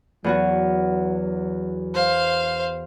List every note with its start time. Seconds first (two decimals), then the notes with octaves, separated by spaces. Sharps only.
0.24 E2 F#3 B3 F#4
1.94 C5 F5